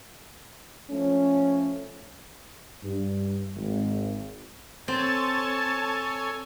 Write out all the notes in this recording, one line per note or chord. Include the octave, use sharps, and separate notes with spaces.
F3 A3 C#4
G2
G#1
C4 A4 C#5 G#5 A5